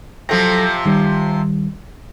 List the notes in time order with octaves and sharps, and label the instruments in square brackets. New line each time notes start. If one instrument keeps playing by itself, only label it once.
[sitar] C3 F3 [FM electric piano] F#3 A4 A#6
[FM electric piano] D#3 G3